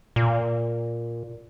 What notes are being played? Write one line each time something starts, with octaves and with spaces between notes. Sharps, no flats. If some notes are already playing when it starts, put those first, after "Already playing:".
A#2